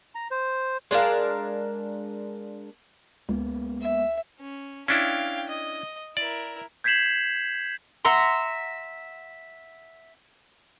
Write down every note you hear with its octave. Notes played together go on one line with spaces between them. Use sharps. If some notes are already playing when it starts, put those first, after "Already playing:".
A#5
C5
G#3 D4 A#4 F5
C#2 G#3 A#3 B3
E5
C#4
C#4 D4 E4 F5 G5
D#5
E4 A#4 D5
G6 G#6 B6 C7 E7 F#7
E5 F#5 A#5 C6